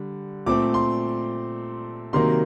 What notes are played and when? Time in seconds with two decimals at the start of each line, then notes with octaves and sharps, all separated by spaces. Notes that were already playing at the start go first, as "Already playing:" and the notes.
Already playing: D3 G3
0.46 A#2 A3 C4 D6
0.74 C6
2.13 C3 D#3 F#3 A#3 C6